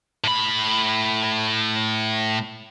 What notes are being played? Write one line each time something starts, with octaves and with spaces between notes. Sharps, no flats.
A2 B5